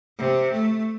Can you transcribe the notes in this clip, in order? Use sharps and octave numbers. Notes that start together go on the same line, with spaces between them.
C3
A3